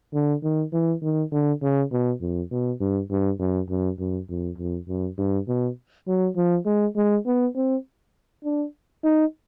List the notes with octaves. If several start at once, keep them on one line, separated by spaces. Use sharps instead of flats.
D3
D#3
E3
D#3
D3
C#3
B2
F2
B2
G2
G2
F#2
F#2
F#2
F2
F2
F#2
G2
B2
F#3
F3
G#3
G#3
B3
C4
D4
D#4